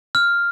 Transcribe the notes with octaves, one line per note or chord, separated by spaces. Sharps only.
F6